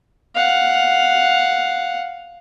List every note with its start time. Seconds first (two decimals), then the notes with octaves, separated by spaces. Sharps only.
0.35 F5 F#5